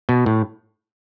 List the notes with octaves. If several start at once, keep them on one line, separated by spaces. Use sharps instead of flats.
B2
A2